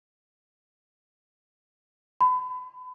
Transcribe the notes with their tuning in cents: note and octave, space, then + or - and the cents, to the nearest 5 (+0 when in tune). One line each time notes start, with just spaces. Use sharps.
B5 +35